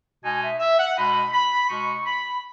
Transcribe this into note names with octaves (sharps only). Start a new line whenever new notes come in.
B2 G#3 D#4 G#5
E5
E5
F#5
B2 G#3 D#4 B5
B5
B2 G#3 D#4 C#6
B5